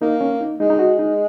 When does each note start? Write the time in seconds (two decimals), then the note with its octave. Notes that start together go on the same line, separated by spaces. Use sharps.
0.02 A#3 D#4
0.21 C#4
0.41 D#4
0.60 G#3 D#4
0.70 D#4
0.79 F#4
0.99 D#4